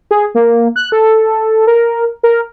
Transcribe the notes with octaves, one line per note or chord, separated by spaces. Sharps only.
G#4
A#3
F#6
A4
A#4
A#4